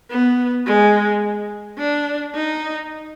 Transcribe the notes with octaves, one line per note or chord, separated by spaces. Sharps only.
B3
G#3
D4
D#4